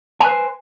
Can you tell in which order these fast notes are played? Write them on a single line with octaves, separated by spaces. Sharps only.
G#5 B4 C5